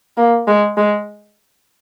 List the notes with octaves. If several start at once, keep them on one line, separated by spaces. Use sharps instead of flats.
A#3
G#3
G#3